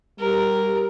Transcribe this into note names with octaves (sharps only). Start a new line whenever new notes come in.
G3 A#4